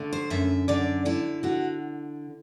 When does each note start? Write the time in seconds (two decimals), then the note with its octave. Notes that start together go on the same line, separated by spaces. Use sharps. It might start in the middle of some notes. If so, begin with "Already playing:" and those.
Already playing: D3 A3
0.13 C5
0.30 F#2 E5
0.68 D3 D5
1.05 D3 E4
1.43 D3 F#4